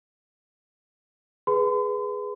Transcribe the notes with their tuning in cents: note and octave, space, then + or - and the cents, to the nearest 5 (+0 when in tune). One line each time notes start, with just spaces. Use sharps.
G#4 +0 B4 +0 C6 -45